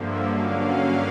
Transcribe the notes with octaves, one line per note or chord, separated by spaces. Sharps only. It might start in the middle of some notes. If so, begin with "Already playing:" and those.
Already playing: G2 D3 F3 A#3 E5
G2 D3 F#3 A#3 C#4 F5